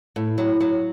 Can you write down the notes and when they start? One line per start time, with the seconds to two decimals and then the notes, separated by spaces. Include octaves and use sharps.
0.16 A2
0.38 F#3
0.60 F#3